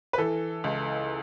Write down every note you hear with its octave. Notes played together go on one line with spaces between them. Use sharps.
B4
E3 A4
C#2